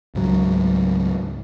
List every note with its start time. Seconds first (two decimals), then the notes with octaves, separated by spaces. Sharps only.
0.15 C#2 G#2 F#3